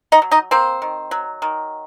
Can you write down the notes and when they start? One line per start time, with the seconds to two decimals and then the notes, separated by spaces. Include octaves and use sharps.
0.12 D#4 D#5
0.22 F#3
0.31 D#4 D#5
0.51 A#3 C4 C5
0.82 D#3
1.11 F#3
1.42 D#3